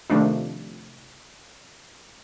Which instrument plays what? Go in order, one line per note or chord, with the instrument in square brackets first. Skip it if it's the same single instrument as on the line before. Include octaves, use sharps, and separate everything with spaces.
[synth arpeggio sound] C3 D#3 F3 A3 D4 D#4